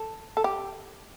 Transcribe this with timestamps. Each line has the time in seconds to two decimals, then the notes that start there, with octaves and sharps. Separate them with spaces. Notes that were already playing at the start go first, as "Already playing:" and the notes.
Already playing: A4
0.37 A4
0.44 G4